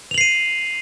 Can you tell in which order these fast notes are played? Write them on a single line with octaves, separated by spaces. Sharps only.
F7 F#7 C7 D#7